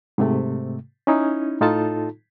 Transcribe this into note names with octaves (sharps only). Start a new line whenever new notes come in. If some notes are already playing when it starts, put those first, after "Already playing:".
G#2 C3 A3
C#4 D#4 E4
A2 D#4 F4 A4 A5